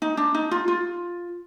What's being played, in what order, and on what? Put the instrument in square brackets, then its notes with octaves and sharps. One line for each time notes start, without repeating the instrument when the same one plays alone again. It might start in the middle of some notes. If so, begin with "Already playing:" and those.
[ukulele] D#4
D4
D#4
F4
F4